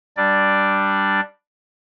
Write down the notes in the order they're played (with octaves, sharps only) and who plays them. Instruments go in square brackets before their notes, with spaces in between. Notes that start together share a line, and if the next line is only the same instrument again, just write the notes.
[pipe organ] G3 D4 D5